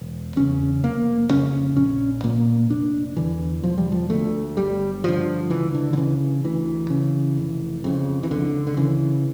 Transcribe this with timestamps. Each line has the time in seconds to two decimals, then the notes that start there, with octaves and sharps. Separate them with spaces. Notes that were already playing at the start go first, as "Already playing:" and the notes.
Already playing: E1
0.36 E2 C#3 C#4
0.83 F1 A#3
1.30 F2 C#3 C#4
1.76 A#1 C#4
2.24 A#2 A#3
2.70 F1 D4
3.16 E2 D3 E3
3.64 E1 F3
3.78 G3
3.92 F3
4.10 D2 D3 A3
4.57 G1 G3
5.04 G2 D3 F3
5.50 C#2 E3
5.74 D3
5.93 D3
5.97 C#3 E3
6.44 D2 E3
6.90 C#3
7.37 F1
7.84 F2 C#3
8.23 E3
8.31 C#2 D3
8.67 D3
8.77 C#3 E3